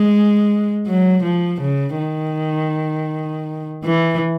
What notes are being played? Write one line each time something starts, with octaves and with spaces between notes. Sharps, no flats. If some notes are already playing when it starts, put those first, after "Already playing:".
Already playing: G#3
F#3
F3
C#3
D#3
E3